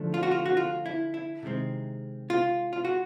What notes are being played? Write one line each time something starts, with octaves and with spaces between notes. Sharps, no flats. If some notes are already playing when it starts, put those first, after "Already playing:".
Already playing: D3 F3 A3 D4
F4
F#4
F4
F#4
F4
E4
E4
C3 D#3 G#3 C4
F4
F4
F#4